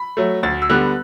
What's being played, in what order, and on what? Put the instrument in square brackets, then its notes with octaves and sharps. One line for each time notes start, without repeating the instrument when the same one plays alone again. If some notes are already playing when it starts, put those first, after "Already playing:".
Already playing: [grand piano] B5
F#3 A3
D2 A6
E6
D3 G3 B3 F#6